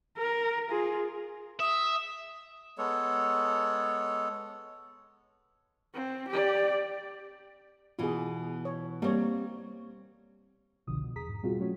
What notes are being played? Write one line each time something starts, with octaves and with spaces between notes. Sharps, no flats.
A#4
F4 G#4
E5 D#6
G#3 B3 A4 C#5
C4
G4 D5
B2 E3 F4 G#4
C#5
G3 A#3 C4 C#5
G1 C2 B2 D3 F3 D#6
B2
E2 G#4 A#5 D#6 B6
G#2
B2 G3 C4 F4 F#4 G#4
F#3 A3 C#4 F#4 C#5